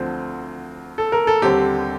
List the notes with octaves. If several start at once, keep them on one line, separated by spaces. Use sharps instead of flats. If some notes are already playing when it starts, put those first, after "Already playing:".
Already playing: D2 D3 F3 C4
A4
A#4
A4
D#2 D3 G3 C4 G4